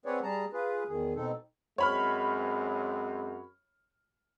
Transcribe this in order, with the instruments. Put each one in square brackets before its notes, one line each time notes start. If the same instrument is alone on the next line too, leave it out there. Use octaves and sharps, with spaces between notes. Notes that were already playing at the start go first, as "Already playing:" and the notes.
[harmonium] C4 G#4 B4 C#5 D5 F#5
G3 G#4 A5 A#5
F4 G#4 B4
E2 D#3 G#4
B2 C4 D#4 A4
[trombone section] F#2 G#3 C4 [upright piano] C#5 B5 F6